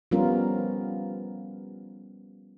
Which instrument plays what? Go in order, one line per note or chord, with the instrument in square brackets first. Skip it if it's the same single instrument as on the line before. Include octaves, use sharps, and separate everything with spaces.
[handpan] F3 G3 B3 C#4 F4 A#4